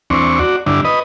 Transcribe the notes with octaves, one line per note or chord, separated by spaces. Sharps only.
E2 C4 D4 C#6
F#4 D5
G2 D3 D4 E4
B4 D#5